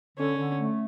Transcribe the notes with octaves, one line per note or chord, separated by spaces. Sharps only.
D3 C#4
D3
A3